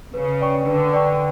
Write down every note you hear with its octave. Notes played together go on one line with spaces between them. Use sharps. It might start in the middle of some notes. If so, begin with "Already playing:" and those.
C#3 B4
D5 G5 C#6
D3 B4
D5 G5 C#6